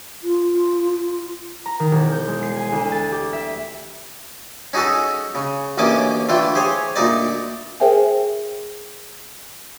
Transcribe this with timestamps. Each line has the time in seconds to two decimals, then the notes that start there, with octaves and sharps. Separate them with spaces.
0.23 F4
1.66 A#5
1.79 D#3
1.92 E1
2.12 G6
2.28 G#3
2.43 C7
2.56 G#5
2.72 D2
2.92 A6
3.12 G4
3.33 E5
4.73 C#4 D#4 F#4 G#4 A4
5.35 C#3
5.78 A1 D2 A#3 C#4 D#5 D6
6.29 D3 E3 A3 F4 G5
6.55 G4 G#4 C5 C#5
6.96 D2 A#2 D#4 D5
7.80 G#4 A#4 C5 E5 G5 G#5